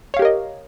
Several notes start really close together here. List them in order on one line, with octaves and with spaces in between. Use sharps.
C#5 F5 G4 A#4 D#5